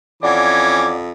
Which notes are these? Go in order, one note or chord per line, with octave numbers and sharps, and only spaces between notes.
F2 E3 C#4 D5 F#5 D6